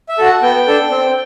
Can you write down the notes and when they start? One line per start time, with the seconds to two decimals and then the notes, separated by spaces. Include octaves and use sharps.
0.09 E5
0.18 F#4 A4
0.26 F#5
0.42 B3 G5
0.67 D4 A4
0.91 C4